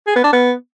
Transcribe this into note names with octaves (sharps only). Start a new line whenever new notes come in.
G#4
B3
D4
B3